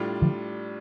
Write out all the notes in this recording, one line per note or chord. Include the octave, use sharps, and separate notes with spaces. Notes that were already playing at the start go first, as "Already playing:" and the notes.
Already playing: A2 G3 D4 F4
D3 F3